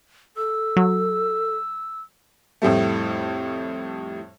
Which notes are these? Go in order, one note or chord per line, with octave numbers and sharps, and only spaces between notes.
A4 E6
F#3
F2 A2 G3 A3